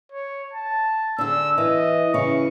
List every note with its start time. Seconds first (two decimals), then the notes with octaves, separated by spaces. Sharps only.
0.12 C#5
0.53 A5
1.18 D3 G#4 E6
1.58 E3 D#5
2.14 C#3 E3 C#6